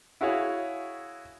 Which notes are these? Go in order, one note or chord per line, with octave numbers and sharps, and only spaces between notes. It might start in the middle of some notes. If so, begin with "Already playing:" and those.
E4 F#4 G#4 C#5 F5